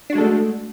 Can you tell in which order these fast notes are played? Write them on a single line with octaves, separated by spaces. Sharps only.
D4 F#4 G#3 A4 A3